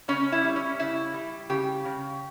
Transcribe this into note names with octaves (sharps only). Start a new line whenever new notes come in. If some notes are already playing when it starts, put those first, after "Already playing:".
C#3 C#4
E4
G3
C#4
C#3 E4
G3
C#3 G4
C#3